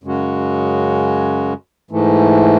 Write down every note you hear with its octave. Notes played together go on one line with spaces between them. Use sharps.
F#2 C#3 G#3 C#4 F#4
G#2 E3 A3